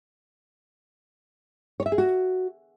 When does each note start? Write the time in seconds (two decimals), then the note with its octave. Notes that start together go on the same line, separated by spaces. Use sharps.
1.80 C#5
1.86 E5
1.92 G#4
1.98 F#4